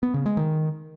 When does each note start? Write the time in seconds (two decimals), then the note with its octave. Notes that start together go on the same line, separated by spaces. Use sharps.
0.03 B3
0.14 C#3
0.26 G#3
0.37 D#3